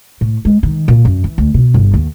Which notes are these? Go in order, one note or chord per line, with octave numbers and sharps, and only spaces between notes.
A2
G#3
D#3
A#2
F#2
E3
D2
B2
G1
D#2